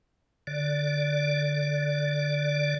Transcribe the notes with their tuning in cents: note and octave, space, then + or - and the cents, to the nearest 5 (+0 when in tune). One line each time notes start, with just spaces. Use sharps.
D3 +0 D5 -10